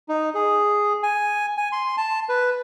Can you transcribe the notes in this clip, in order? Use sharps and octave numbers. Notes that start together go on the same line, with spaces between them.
D#4
G#4
G#5
G#5
C6
A5
B4